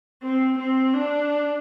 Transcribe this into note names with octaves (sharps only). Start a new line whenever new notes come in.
C4
C4
D4